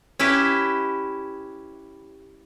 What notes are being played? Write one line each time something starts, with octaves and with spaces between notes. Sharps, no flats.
C#4 E4 G4 B4